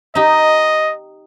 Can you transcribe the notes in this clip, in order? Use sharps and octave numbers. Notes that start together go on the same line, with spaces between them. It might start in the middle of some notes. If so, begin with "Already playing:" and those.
D#4 G4 D#5